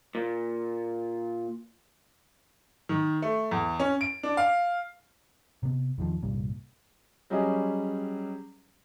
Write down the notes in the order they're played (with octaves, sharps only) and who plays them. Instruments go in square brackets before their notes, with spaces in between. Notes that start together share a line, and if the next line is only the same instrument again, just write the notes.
[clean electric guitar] A#2
[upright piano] D#3
A3
E2
C#4
D7
D4
F5
[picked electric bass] C3 B3
E2 D#3 F3
C2 G2 A#2
[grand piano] F#3 G3 C#4 G4 G#4 D#5